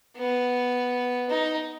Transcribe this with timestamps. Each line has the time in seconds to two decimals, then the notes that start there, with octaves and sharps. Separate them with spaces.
0.17 B3
1.30 D#4